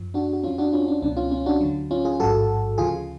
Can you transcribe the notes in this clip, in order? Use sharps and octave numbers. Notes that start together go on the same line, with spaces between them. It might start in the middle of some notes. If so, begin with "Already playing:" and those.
Already playing: F#2 F3
D4 F#4
F#4
F2 F3 C#4 F4
D4 F#4
C#4 F4
D4
C#2 B2 F#3 D4
C#4 F4
C#4 F4
D4 F#4
D2 D3 F#3
C#4 F4
F4 G#4
A1 G#2 F#3 F#4 A4
D2 C#3 F3 F4 G#4